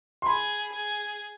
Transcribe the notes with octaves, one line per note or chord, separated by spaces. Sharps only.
C6
G#4 B5
G#4